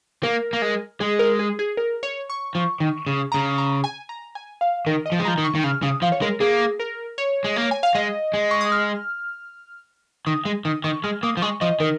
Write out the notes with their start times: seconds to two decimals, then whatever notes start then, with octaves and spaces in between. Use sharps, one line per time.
0.23 A#3 A#4
0.53 A#3
0.62 G#3
1.00 G#3 G#4
1.19 A#4
1.39 G#4
1.59 G#4
1.77 A#4
2.03 C#5
2.30 C#6
2.55 F3
2.80 D#3
3.07 C#3
3.32 C#3 A#5
3.58 A#5
3.84 G#5
4.09 A#5
4.35 G#5
4.61 F5
4.86 D#3 A#4
5.06 D#5
5.12 F3
5.19 G#3
5.25 F3 A#5
5.38 D#3
5.44 C#6
5.55 D#3
5.63 C#3 F6
5.82 C#3 D#6
6.02 F3 F5
6.12 C#5
6.22 G#3 A#4
6.40 A#3 G#4
6.79 A#4
7.18 C#5
7.44 G#3
7.56 A#3
7.71 G#5
7.83 F5
7.95 G#3 D#5
8.34 G#3
8.51 C#6
8.61 D#6
8.72 F6
10.26 D#3 D#6
10.45 G#3
10.65 D#3 D#6
10.84 D#3 C#6
11.03 G#3 F6
11.23 A#3 D#6
11.37 F3
11.42 G#3 C#6
11.61 F3 D#5
11.80 D#3 A#4